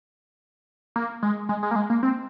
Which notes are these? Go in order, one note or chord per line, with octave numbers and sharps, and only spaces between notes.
A#3
G#3
G#3
G#3
A#3
G#3
A#3
C4